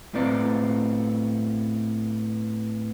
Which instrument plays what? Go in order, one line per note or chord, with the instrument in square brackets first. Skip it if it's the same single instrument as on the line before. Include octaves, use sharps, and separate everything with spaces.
[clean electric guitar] A2 B3 C4 D5